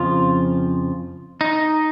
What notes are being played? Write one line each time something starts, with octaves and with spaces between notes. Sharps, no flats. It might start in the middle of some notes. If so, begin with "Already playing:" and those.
Already playing: F2 C#3 F3 F4
D#4